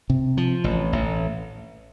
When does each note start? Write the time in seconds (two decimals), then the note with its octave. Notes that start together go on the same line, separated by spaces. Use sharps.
0.10 C3
0.37 F3
0.64 A1
0.93 A1